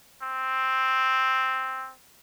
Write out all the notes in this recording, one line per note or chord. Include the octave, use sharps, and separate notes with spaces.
C4